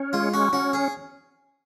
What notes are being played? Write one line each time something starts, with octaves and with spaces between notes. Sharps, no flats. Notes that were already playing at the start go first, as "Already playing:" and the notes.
Already playing: C#4
G#3 F4
C#4 F#4
C#4 F#4
G#4